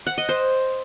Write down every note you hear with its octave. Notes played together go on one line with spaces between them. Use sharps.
F#5
D#5
C5